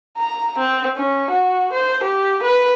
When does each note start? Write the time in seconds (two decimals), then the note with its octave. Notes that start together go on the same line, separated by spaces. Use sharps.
0.18 A#5
0.58 C4
0.97 C#4
1.31 F#4
1.72 C5
2.04 G4
2.43 B4